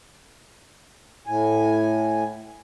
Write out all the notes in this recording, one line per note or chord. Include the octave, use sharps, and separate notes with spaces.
A2 G#5